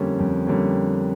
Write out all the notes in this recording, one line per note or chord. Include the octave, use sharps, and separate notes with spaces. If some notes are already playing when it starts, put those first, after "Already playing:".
Already playing: F2 D3 G3 A#3 C#4
F2
D3 G3 A#3 C#4